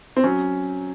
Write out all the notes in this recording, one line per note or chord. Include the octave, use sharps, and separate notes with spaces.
C4
F#3 C#4